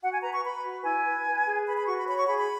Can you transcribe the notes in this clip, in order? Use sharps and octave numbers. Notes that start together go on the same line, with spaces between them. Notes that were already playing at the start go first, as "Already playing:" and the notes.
F#4 F#5
G#5
B4 A#5
C#6
B4 B5
F#4
E4 G#5
B4
B4
G#4
B4 B5
B5
F#4 C#6
B5
C#5 B5
C#6
G#4 B5
B5